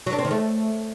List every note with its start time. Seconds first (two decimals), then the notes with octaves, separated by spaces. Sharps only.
0.06 F#3
0.12 D4
0.19 C4
0.25 D#3
0.31 A3